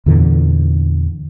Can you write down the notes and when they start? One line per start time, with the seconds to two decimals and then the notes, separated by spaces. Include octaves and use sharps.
0.06 E2 A#2 D3 E3